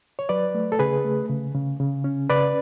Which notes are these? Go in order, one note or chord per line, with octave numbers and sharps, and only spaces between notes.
C#5
F#3 B4 D5
A3
A4
C#3 G#4 B4
A3
C#3
C#3
C#3
C#4
C#3 B4 D5